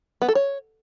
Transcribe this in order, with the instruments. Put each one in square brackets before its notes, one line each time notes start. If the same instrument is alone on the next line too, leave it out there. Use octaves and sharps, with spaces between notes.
[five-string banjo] B3
A4
C#5